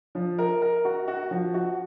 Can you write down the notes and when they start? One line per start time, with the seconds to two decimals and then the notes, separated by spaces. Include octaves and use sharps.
0.15 F3
0.39 A#4
0.62 A#4
0.85 F#4
1.08 F#4
1.31 F3
1.54 F#4